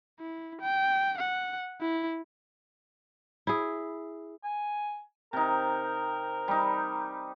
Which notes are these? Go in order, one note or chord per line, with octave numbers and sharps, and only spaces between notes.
E4
G5
F#5
E4
E4 G#4
G#5
C3 D#4 A#4
G3 D#4